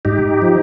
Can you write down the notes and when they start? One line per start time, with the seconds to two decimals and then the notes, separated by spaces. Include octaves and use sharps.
0.05 G#2 D#4 G4
0.42 F3